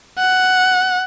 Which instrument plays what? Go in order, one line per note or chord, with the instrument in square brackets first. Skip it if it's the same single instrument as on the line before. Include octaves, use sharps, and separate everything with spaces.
[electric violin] F#5